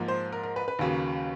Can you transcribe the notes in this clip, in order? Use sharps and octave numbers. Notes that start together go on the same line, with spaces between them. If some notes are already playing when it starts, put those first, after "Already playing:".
Already playing: G#2 F3 A#3
C5
A#4
A#4
B4
B4
D#2 C#3 F#3 A#3